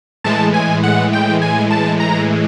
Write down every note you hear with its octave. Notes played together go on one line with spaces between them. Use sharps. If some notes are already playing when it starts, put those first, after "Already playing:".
A2 E3 G#3 A5
G#5
F#5
G5
G#5
A5
A#5